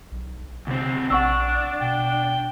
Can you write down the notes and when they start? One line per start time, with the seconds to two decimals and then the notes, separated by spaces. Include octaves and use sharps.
0.11 B1
0.67 D2 C3 C4
1.10 A#1 D4 F#5 C#6 E6
1.81 B2 G5